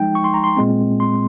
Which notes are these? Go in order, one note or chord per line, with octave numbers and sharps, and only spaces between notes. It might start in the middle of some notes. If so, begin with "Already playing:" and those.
Already playing: F3 G#3 D#4 G5
C#6
C6
A#5
C6
A#2 G#3 C4
C6